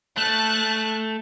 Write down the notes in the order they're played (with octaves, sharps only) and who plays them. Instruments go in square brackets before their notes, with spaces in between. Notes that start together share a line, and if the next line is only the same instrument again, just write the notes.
[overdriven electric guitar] A3 [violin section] A5 F#6